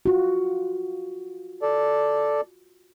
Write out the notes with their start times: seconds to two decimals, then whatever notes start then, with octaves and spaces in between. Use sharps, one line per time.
0.06 F4 F#4
1.62 A4 D5